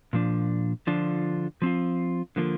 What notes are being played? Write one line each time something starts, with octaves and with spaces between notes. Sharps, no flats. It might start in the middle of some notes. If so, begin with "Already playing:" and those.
A#2 F3 D4
D3 F3 D4 F4
F3 C4 F4
D3 F3 A#3 F4